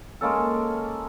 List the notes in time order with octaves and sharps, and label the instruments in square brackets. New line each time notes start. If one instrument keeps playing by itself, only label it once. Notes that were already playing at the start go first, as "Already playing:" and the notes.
[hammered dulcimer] G#3 A#3 C#4 A4